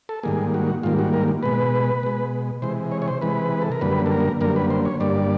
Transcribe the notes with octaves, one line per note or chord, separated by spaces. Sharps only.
A4
G#2 D#3 G3 A#3 G#4
F#4
G#2 D#3 G3 A#3 F4
F#4
A#4
B2 G#3 B4
B2 G#3
C3 E3 G#3 C5
C#5
C#5
C5
C3 E3 G#3 B4
A4
A#4
F#2 D3 G3 A#3 B4
A4
A#4
F#2 D3 G3 A#3 A#4
B4
C5
C#5
G2 D3 G3 A#3 D5